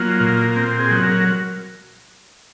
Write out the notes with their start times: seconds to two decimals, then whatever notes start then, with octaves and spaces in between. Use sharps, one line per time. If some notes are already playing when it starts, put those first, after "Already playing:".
Already playing: F#3 A#3 F4
0.20 A#2
0.56 C4
0.79 G#4
0.91 F#3
1.03 A#4